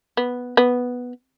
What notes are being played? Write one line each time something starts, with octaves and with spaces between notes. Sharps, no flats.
B3
B3